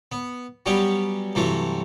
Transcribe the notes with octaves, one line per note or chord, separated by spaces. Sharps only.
B3
F#3 G3 B3 C#4 G4
G2 C3 E3 F#3 A3